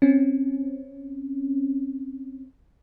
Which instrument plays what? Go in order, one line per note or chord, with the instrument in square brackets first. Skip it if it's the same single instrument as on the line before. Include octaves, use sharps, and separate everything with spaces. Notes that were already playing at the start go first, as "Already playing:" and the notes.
[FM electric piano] C4 C#4